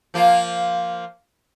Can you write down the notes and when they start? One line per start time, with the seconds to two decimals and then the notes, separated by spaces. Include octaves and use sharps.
0.14 F3 A#3 F4